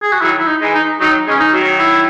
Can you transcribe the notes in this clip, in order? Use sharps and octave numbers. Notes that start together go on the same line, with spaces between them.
G#4
F#4
D#3 F#3 E4
E4
D#4
E3 G#3
D#4
D#3 F#3 D#4
E3 G#3 C#4
D#4
D#3 F#3
E4